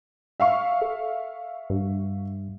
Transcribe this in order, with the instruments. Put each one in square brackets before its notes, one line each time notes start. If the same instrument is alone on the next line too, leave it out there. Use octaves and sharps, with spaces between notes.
[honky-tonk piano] E5 F5 C#6
[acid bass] A4
G2